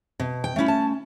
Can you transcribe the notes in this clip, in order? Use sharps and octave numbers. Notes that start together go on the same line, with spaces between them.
B2
G5
A3 C#4 E4
A5